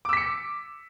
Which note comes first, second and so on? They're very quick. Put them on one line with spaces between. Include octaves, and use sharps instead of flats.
D6 E6 B6 C#7